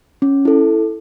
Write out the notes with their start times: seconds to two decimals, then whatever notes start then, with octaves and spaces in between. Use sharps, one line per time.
0.22 C#4
0.45 E4 A4